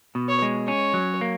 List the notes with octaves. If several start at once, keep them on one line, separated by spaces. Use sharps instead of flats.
B2
C#5
G#3
C#4 C#5
F#3
A#3